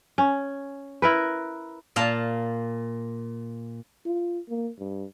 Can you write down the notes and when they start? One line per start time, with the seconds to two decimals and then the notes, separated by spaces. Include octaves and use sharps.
0.18 C#4
1.02 E4 A#4 B4
1.96 A#2 F5 A5
4.06 F4
4.49 A#3
4.79 G2